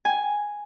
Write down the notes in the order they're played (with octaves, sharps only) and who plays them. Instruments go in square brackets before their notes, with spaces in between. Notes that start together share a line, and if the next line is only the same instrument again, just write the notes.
[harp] G#5